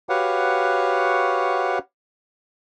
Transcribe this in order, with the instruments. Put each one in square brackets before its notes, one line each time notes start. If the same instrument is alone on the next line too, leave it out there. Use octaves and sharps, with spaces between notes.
[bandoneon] F#4 G4 B4 C#5 F5 F#5